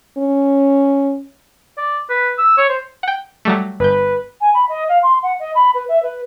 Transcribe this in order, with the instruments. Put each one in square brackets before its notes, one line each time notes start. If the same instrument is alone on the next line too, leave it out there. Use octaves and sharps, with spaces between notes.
[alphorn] C#4
[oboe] D5
B4
E6
C#5
C5
[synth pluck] F#5 G5
F#3 G3 A3
[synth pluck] G1 G6 [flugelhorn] B4
[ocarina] G#5
B5
D#5
F5
C6
F#5
D#5
B5
B4
E5
B4